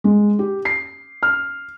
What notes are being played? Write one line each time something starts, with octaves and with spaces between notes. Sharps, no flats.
G#3
G4
C7
F6